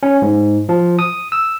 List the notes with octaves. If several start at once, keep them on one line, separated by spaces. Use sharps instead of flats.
C#4
G#2
F3
D#6
E6